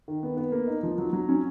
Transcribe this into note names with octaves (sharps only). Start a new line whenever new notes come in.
D#3
B3
B3
A#3
D#4
F3
F#3
F#3
C#4